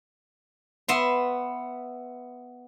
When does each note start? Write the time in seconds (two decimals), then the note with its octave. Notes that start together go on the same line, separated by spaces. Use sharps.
0.88 B3 E5 C6